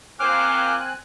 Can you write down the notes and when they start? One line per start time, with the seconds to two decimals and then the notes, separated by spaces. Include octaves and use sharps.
0.20 A#2 A#3 C4 C5 G#5 D6 F6 F#6